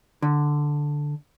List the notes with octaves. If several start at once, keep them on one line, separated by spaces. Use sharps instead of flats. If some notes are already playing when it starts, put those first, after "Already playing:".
D3